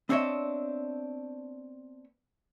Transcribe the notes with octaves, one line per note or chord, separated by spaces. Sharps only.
B3 C4 D4 C#5 D#5 E5